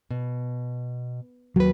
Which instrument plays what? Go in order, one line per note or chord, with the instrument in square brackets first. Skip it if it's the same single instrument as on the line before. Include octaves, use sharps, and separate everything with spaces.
[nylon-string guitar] B2
[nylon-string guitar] D#2 B4 [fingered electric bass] F#3